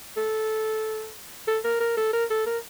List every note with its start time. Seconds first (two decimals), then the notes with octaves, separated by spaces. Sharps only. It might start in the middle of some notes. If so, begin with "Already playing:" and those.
0.17 A4
1.48 A4
1.64 A#4
1.80 A#4
1.97 A4
2.13 A#4
2.30 A4
2.46 A#4